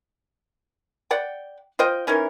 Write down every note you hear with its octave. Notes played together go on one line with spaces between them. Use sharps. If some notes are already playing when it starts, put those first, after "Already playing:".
D5 F#5 G5
F4 C5 D#5 G5
E3 C#4 D#4 A#4